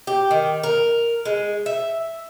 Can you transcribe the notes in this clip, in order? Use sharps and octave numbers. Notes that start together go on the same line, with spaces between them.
G4
D#3
A#4
G#3
E5